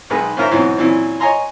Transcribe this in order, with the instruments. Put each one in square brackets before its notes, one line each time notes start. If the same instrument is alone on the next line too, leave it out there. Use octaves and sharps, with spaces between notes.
[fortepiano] B1 D#3 G#3 B4
G#2 C#4 F4 A#4 C5 E5
G#2 B2 E3 F#3 C4 C#4
A#2 E3 F#3 C4 C#4 E4
C#5 D#5 G#5 A#5 C6